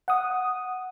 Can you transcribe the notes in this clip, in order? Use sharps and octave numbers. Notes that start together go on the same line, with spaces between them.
F#5 D#6